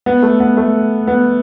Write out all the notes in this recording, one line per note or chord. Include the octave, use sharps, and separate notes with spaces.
B3
A3
B3
A3
B3